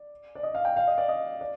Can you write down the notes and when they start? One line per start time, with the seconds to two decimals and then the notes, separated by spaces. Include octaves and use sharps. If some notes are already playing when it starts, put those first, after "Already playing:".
Already playing: D5
0.35 D5
0.43 D#5
0.55 F5
0.65 G5
0.76 F5
0.87 D#5
0.98 D5
1.09 D#5
1.41 D5